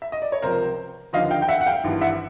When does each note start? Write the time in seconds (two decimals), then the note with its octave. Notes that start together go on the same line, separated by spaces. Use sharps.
0.02 E5
0.12 D#5
0.22 D5
0.32 C#5
0.42 C#2 C3 F3 A#4 C5
1.13 D#2 D3 F3 D#5 F5
1.31 F5 G5
1.42 G5
1.49 E5 F#5
1.61 F#5
1.67 F5 G5
1.84 G#1 G2 E3
2.01 E5 F#5